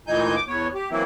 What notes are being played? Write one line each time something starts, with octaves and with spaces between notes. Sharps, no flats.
D2 A#2 E3 D#4 G#5 G6
D6
E2 B3 C#5
G4
E3 F#3 A#3 C4 E4